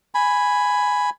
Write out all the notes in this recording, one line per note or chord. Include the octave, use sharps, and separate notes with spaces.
G#5 B5